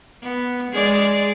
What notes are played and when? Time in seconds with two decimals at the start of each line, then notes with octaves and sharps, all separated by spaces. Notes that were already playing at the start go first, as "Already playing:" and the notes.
0.23 B3
0.71 G#3 G#4 D5